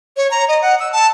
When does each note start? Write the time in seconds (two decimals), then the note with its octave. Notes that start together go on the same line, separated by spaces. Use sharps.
0.17 C#5
0.31 A#5
0.48 D#5
0.62 F#5
0.80 E6
0.93 A5